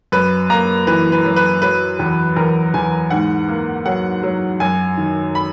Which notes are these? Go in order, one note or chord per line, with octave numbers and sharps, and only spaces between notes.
F#2 B4
A#3 A#5
E3 B4
B4
F#2
B4
F#3 B4
E2
E2 A#4
E2 G#5
G#2 F#5
A#3
F#3 F#5
F#3
F#2 G#5
D#3
B5